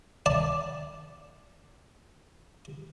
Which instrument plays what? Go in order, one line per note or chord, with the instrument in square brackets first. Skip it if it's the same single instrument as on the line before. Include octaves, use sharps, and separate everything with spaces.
[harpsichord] D5 A5